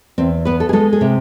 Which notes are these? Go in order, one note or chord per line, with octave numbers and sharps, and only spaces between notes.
E2 C4
B3 B4
A4
G#4
G#3 A4
G#4
C3